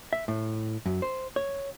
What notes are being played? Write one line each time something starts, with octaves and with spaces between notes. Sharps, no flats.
E5
A2
F#2
C5
C#5